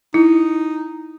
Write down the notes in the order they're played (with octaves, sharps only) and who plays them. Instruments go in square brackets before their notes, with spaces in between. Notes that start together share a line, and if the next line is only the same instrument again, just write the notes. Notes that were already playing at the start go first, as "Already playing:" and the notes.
[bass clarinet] D#4 [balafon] E4